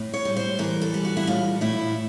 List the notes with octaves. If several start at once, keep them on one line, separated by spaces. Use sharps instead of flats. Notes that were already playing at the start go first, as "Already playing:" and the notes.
Already playing: A2
C#5
G3
C5
E3 A#4
A4
G3
F#4
E4
A2 F4
A2 E4